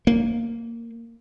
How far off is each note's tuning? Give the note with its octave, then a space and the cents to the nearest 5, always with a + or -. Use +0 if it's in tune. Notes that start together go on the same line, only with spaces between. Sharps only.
A#3 -10